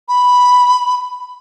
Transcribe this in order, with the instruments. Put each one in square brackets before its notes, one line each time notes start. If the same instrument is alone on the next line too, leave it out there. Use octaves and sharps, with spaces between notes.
[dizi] B5